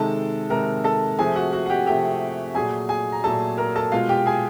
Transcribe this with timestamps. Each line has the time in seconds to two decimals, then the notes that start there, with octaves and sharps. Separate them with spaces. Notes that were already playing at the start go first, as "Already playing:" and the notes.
Already playing: C3 D#3 G#3 A4 A5
0.50 C3 D#3 G#3 A#4 A#5
0.84 A4 A5
1.18 C3 F3 A3 G#4 G#5
1.36 F#4 F#5
1.52 F#4 F#5
1.66 F#5
1.70 G4 G5
1.86 C3 F3 A3 G4 G5
2.55 A#2 F#3 A3 G#4 G#5
2.89 G#4 G#5
3.12 A#5
3.24 A#2 F#3 A3 A4 A5
3.58 A#4 A#5
3.76 A4 A5
3.92 B2 G#3 F4 F5
4.09 G4 G5
4.26 G#4 G#5